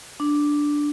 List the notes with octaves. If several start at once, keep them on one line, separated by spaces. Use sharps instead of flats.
D4